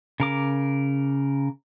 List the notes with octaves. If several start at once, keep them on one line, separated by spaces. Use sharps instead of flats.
C#3 A#4 D6